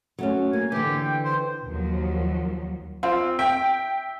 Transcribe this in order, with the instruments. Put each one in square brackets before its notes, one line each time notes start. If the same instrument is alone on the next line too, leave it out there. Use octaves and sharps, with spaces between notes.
[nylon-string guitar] F#3 A3 C#4
[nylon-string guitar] A#3 [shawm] G#5
[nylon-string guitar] D3 E3 [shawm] G4
[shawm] G5
C5
[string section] D#2 F3 F#3
[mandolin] C4 [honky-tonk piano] F4
[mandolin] E5 [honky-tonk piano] G5